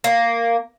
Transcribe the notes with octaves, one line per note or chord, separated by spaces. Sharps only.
A#3